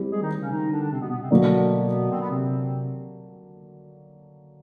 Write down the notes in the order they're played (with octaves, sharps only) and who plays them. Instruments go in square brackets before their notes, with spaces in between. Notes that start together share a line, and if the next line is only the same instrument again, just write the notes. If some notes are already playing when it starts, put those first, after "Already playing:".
Already playing: [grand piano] G3 C4 E4 G4
[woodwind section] G#3 G#4
D#3 D#4
C#3 C#4
D#3 D#4
D3 D4
C3 C4
B2 B3
B2 B3
C3 C4
[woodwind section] B2 B3 [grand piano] D3 F#3 A#3 D4
[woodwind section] C4
B3
C3 C4